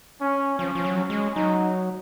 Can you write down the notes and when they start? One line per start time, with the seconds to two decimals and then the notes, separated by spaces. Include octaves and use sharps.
0.21 C#4
0.59 F3 C#4
0.75 F3
0.84 F#3
0.97 C#4
1.10 G#3
1.35 F#3 D#4